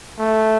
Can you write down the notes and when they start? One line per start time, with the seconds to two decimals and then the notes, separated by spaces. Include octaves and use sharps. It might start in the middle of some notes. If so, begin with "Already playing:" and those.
0.19 A3